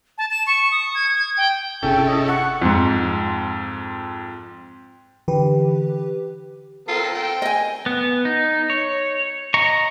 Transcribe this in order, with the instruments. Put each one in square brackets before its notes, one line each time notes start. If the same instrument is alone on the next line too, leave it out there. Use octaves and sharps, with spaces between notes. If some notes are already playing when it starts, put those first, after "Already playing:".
[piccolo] A5
E7
C#6
D#6
G#6
G#6
G5
[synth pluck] G1 C3 G#4 [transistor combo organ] C#4 E4 A4 [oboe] G5
[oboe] D#5
[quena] F#5 [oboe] C#6
[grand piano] F2 G#2
[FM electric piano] D3 E3 G4 B4
[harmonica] C4 A4 A#4 [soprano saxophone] F4
[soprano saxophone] G5
[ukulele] D#5 G#5
[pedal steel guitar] B3
D#4
C#5
D#5 A#5 C#6